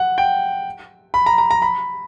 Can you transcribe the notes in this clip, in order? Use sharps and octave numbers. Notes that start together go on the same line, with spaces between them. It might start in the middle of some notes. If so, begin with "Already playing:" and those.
Already playing: F#5
G5
B5
A#5
A#5
A#5
B5